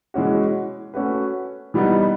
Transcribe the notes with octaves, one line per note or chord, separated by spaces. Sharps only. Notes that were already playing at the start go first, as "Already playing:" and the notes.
E3 G#3 C#4 F#4
A3 C#4 F#4 B4
E3 G3 B3 D#4